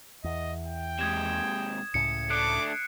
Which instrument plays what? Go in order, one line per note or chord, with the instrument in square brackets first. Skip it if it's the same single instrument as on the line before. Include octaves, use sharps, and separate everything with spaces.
[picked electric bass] E2 [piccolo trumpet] D#5
[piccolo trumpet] G5
[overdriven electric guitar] G#2 C3 [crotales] D#6 G#6 E7
[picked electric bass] C#2 A2 C#3 [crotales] C#7
[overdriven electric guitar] A3 D4 [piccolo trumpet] D6 [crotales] F#6 C7 D7